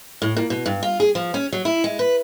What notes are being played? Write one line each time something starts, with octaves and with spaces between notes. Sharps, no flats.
A2
A#2
B2
G2
F4
G#4
F3
C#4
F#3
E4
G#3
B4